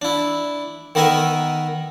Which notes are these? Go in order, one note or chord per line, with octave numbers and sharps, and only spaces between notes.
D4 E4
D#3 B3 A#4 E5 G#5